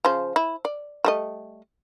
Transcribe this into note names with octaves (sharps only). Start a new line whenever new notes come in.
C#3 F3 C5
E4
D5
G3 A3 D#5